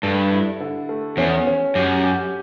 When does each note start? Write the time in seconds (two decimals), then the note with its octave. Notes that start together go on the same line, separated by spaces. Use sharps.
0.03 G2 A4
0.31 E4
0.60 D3
0.89 A3
1.17 E2 C#4
1.47 C#4
1.75 F#2 G4
2.04 G4